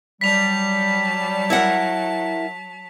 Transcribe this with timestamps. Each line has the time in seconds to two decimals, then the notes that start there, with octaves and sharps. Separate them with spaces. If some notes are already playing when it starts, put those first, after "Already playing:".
0.21 F#3 G3 A5 B6 F7
1.50 E4 A#4 F#5